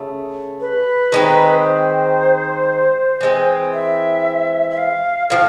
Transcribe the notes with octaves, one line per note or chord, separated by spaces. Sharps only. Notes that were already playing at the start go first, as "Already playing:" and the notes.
Already playing: C#3 A3
B4
D#3 G#3 C4
C5
E3 G#3 C4
E5
E5
F5
A2 F3 F5